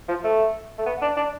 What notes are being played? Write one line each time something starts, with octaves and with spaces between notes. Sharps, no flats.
F3
A3
A3
B3
D4
D4